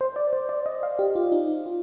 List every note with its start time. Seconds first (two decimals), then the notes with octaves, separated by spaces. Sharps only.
0.01 C5
0.16 D5
0.33 C5
0.49 D5
0.66 D#5
0.83 F5
0.99 G4
1.15 F4
1.32 D#4
1.66 F4